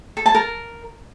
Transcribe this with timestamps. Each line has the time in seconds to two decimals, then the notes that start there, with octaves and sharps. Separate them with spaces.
0.17 A4
0.26 A5
0.35 A#4